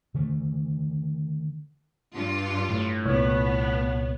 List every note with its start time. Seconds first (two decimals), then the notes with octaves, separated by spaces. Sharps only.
0.14 D3 D#3 A3
2.15 G2 F4
2.69 A2
3.06 C2 A#2 B3 C#5